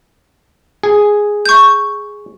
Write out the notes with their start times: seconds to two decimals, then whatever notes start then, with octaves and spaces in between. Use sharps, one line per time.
0.83 G#4
1.46 C#6 G6